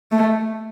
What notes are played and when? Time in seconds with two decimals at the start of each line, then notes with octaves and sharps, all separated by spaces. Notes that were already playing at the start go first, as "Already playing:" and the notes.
0.11 A3